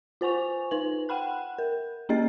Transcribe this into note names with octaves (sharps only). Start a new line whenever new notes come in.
F4 C5 G#5 C#6 F7
D#4 B4 F#7
F#5 G5 B5 F#6
A#4
A#3 C#4 G#4 D#5 A6